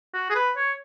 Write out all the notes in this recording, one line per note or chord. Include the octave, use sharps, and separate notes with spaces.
F#4
G#4
B4
C#5